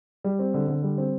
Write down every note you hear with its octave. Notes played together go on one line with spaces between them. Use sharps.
G3
C4
D3
D3
G3
C4